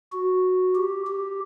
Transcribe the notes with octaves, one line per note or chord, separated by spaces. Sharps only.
F#4
G4
G4